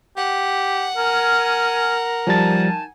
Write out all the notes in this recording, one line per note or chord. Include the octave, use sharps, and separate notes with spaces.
G4 F#5
A#4 G#5 F6
F3 G3 D#4 G#5 A5 A6